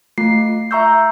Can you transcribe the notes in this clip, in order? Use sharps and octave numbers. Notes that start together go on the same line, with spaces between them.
A3 F4 C7
E5 A#5 C#6 E6 G6